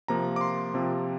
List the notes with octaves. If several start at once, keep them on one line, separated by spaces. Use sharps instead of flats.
C3 F3 A#3 A#5
D6
C6
C3 F3 C4